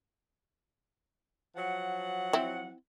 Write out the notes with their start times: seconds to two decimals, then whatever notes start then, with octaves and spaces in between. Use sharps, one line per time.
1.55 F3 F#3 F#5
2.33 C4 E4